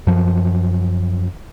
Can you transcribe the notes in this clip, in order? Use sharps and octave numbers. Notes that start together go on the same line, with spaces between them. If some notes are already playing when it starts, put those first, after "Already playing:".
F#2 F3